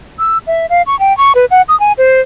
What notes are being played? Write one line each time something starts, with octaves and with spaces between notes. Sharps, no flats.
E6
E5
F5
C#6
G5
C#6
B4
F#5
D#6
G#5
C5